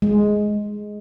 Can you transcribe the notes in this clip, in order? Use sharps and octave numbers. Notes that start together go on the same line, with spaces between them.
G#3